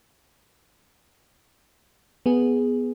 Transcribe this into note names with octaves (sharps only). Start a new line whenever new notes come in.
B3 G#4